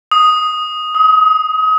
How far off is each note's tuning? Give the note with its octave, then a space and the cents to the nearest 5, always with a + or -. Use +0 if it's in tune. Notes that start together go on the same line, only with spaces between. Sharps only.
D#6 +0
D#6 +30